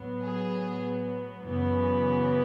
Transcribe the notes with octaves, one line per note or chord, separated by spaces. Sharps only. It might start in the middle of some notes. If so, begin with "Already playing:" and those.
Already playing: A2 F#3 B3
G#4
F#2 C#3 E3 B3